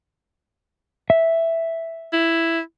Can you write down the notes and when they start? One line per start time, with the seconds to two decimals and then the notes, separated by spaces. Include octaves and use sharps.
1.10 E5
2.13 E4